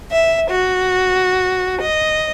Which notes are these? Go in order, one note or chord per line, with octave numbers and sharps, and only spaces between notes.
E5
F#4
D#5